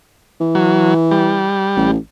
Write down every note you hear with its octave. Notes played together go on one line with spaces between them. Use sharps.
E3
F#3
G3
A1